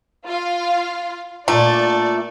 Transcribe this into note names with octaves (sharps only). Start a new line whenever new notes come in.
F4 F5
A#2 A3 D4 F4 D5